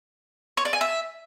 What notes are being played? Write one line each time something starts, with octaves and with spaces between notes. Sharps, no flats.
C#5
D5
G#5
E5